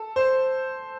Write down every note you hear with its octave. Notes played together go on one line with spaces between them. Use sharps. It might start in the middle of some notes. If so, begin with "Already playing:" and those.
Already playing: A4
C5